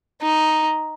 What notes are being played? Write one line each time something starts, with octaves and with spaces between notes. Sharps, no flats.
D#4